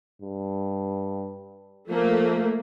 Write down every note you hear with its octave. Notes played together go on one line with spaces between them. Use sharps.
G2
F3 A3 A#3